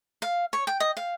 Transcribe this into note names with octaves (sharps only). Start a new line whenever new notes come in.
F5
C#5
G5
D#5
F5